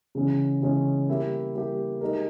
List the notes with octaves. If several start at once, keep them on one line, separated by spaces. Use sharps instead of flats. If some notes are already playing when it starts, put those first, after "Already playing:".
C#3 E3 G#3 C#4
C#3 E3 G#3 C#4
G3 A#3 E4 G4
G3 A#3 E4 G4
G#3 D#4 G4 A#4